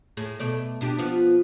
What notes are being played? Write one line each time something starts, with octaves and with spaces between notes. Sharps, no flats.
A2 G#4
B2 A3 D5
B2 D4 G4
F3 B3 F4